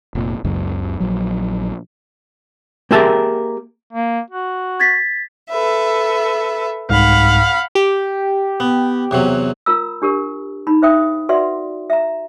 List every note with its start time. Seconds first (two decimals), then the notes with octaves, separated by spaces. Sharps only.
0.15 F1 A#2
0.45 F#1 C#2 F#2
1.00 A#1 F#3
2.91 A#3 G4 G#4 A#4 E5 A5
3.93 A#3
4.31 F#4
4.80 G#6 A6 B6
5.49 A4 B4 E5
6.90 C2 G#2 F5 F#5 B5
7.75 G4
8.60 B3
9.11 E2 C3 F#3
9.66 F4 A#4 A#5 B5 E6
10.02 D4 G4 A#4
10.67 D#4 B5
10.82 D#4 C5 E5 F5 G5 D#6
11.29 F#4 B4 D5 E5 F#5 C6
11.90 E5 A#5